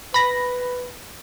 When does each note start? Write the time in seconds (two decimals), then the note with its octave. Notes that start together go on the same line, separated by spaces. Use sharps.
0.14 B4 B5 A#6